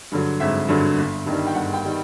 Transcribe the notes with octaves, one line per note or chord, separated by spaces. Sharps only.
G2 D3 F#3
G#1 E5
G2 D3 F#3
G1
G2 D#3 G3
G5
G1 F#5
G5
D#3 G3